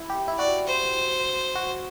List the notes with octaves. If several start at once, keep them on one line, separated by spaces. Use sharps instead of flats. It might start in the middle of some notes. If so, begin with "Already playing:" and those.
Already playing: E4
G4
E4
F#4 D5
C5
F#4